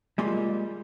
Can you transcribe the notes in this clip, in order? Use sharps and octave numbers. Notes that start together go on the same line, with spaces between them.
G3 G#3 A#3 F4